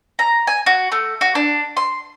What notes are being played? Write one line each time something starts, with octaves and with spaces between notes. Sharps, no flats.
A#5
G#5
F#4
A3
F#4
D4
C6